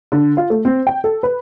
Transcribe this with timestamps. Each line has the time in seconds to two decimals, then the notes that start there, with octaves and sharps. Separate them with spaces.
0.12 D3
0.37 F4
0.50 A3
0.65 C4
0.87 G5
1.04 A4
1.23 B4